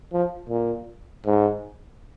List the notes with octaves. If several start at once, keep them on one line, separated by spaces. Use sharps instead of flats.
F3
A#2
G#2